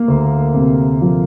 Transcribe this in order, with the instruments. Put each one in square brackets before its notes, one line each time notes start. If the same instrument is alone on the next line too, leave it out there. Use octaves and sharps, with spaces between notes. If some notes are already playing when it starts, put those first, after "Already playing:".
Already playing: [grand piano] A#3
D2
C3
F3